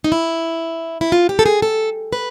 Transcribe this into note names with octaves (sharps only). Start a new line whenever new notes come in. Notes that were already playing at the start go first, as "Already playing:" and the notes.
D#4
E4
E4
F4
G4
A4
G#4
A4
B4